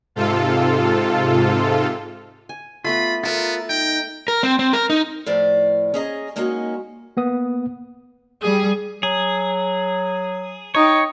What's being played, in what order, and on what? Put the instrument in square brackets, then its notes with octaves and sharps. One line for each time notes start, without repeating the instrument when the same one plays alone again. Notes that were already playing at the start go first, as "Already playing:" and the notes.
[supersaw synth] G#2 C3 F4 A4
[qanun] G#5
[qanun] A3 B3 B4 [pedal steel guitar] F4 [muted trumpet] B5
[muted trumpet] B3 [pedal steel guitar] F4 A#4 [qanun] A4 E5 B5
[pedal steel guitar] D#4 [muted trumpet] G5
[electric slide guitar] A#4
C4
C4
A#4
D#4
[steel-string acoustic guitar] A2 F3 D5
C#4 G#4 D#5 A#5
G#3 A#3 C#4 D#4 F#4
[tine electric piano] A#3 B3 D#6
[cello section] G3 [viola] G#4
[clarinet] F#3 [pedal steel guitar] G#4
[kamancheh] D#4 G5 [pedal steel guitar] C#5